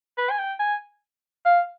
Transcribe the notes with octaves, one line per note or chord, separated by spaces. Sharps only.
B4
G#5
G5
G#5
F5